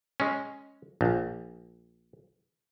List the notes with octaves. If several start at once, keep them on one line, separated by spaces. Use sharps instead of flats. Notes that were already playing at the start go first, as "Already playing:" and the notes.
G#3 C#4
A#1